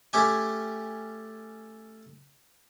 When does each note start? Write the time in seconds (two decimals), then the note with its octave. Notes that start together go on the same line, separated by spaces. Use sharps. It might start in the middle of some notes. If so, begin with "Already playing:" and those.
0.13 A3 C#4 G4 G5 G#5